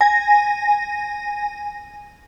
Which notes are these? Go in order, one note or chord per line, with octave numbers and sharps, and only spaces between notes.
G#5 A#6